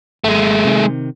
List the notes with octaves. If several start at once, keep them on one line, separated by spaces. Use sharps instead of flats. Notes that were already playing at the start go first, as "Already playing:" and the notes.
G#1 G#3 A3
C3 D#3